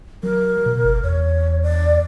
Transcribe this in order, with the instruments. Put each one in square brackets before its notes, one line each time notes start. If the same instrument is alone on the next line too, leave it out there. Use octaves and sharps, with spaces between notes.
[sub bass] F#3 [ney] A#4
[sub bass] B2
G1
[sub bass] E2 [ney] C#5
[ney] D5